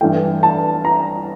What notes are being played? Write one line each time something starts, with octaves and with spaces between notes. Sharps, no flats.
G2 E3 A3 G5
A5
A#5